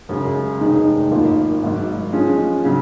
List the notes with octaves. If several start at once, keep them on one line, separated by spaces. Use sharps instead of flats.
F#2 C#3 G#3
F1 D#2 D#3 G#3 D#4
G#1 F#2 D#3 A#3 F4
G#1 G#2 F#3
G#2 F3 G#3 C#4
C#3 F#3